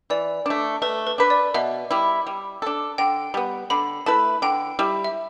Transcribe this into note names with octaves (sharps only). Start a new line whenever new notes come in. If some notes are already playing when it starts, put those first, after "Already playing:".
E3 D5
A3 D4
A3 B4
B4
D4 B4
D5
B2 E5
G3 E4
G3
D4 A4
D3 G5
G3 B3
D3 B5
A3 E4 B4 A5
D3 G5
G3 E4
E5